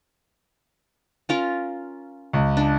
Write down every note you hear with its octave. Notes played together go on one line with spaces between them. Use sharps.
C#4 F4 A#4
C#2
D4